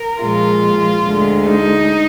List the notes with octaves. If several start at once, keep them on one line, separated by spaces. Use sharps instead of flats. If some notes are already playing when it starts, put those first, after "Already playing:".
Already playing: A#4
A#2 F3 G#3 F4
D2 D3 G#3
D#4